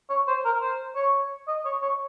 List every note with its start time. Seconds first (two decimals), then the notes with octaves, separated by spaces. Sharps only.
0.10 C#5
0.28 C5
0.45 A#4
0.61 C5
0.96 C#5
1.48 D#5
1.65 C#5
1.82 C#5